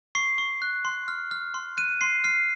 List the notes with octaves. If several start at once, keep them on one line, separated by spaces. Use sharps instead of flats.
C#6 C7
C#6
F#6
C6
F6
F6
C6
F#6 D#7
C6 C7
F6 C7